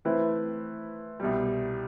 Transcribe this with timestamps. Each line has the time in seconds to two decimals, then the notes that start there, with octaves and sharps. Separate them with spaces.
0.05 E3 A3 C4 E4 B4
1.20 C2 B2 G3